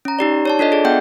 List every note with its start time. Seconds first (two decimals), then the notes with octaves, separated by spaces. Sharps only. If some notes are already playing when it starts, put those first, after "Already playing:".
0.05 C#4 A#5
0.19 D#4 G4 D5
0.45 C#5 D5 A5
0.59 D4 F4 A4 D#5
0.72 G#4 D5
0.85 B3 E5 F#5 G5 G6